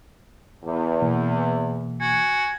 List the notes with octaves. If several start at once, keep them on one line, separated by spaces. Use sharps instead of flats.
E2
B2 E3 A#3
F#4 G#5